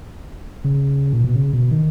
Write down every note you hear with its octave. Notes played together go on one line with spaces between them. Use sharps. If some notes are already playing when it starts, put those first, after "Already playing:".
C#3
A#2
B2
C#3
B2
D#3